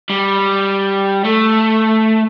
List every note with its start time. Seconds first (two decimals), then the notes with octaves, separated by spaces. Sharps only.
0.10 G3
1.25 A3